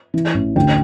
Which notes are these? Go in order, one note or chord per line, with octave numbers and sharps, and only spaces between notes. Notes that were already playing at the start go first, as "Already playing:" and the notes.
E3
A1
D2 G5